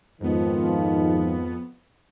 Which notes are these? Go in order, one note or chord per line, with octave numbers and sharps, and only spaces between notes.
F2 G#2 D#3 F3 B3